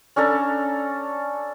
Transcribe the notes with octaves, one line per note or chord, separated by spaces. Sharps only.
C#4 D4 A4 A#5